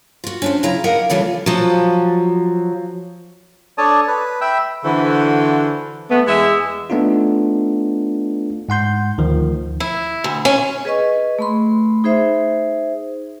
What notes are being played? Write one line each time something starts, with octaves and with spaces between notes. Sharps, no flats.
F4 F#4
C#4 D4 C5
C#3 F#3 E4 F4 A#5
G4 A#4 D#5 F5 F#5
C#3 E3 G3 A3 F4 C#5
F3 F#3
D4 A4 C#5 D5 A5 D#6
B4
E5 G5 B5 E6
D3 E3 E4 F#4 A4 C5
A3 B3
E2 G#3 G#4 E5
A3 B3 D4 D#4 F4
G#2 F#5 C6 G6
D2 D#3 F3
E4
D2
C#4
G#4 B4 D#5 C#6
A3 B5 C6
D#4 G#4 C5 E5